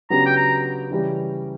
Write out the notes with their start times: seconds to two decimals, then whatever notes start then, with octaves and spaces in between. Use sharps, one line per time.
0.10 C#3 F#3 B3 D4 G4 A#5
0.26 G5
0.37 A#5
0.91 C#3 E3 G3 C#4 G4